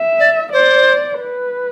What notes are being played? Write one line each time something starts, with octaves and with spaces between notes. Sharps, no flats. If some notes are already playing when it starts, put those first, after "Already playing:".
Already playing: E5
D5
C5 D5
B4